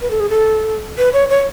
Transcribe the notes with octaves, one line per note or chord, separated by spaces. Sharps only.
B4
A4
G#4
A4
B4
C#5
C#5